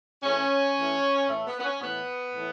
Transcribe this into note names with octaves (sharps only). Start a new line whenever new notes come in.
A2 E3 C#4
A2 E3
A2 E3 A3
B3
B3
C#4
A2 E3 B3
A2 E3